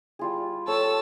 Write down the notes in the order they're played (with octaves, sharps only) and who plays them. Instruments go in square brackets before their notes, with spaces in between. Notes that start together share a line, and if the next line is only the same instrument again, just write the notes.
[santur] G3 F4 G#4
[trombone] A4 [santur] C#5 [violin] A5 E6